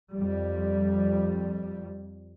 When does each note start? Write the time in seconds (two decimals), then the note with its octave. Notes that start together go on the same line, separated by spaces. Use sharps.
0.16 F2 G3